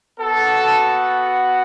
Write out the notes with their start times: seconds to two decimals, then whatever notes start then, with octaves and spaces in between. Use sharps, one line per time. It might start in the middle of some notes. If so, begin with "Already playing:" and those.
0.19 B3 F#4 A4